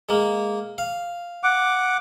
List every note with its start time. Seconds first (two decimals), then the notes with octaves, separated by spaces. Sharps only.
0.09 G#3 A#3
0.78 F5
1.43 F#5 D6